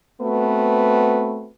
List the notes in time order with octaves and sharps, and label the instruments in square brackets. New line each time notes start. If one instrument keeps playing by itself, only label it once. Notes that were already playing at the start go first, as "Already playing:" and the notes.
[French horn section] A3 B3 C4 F#4 B4